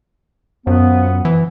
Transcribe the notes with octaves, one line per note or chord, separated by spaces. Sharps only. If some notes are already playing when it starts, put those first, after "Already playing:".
F#2 F3 B3
E3